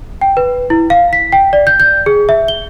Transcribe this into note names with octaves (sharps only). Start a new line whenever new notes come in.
G5
B4
E4
F5
B6
G5
D5
G6
G6
G#4
E5
G7